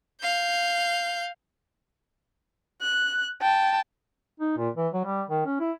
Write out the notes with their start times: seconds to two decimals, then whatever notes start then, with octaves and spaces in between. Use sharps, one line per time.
0.22 F5 G6
2.82 F#6
3.41 G5 A5
4.40 D#4
4.57 A#2
4.77 E3
4.93 F#3
5.05 G3
5.30 D#3
5.45 C#4
5.60 E4